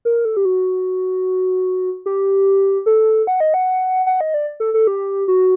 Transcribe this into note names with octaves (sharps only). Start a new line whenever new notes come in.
A#4
A4
G4
F#4
G4
A4
F#5
D#5
F#5
F#5
D#5
D5
A4
A4
G4
F#4